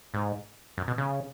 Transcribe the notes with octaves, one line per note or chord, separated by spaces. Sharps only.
G#2
F#2
B2
C#3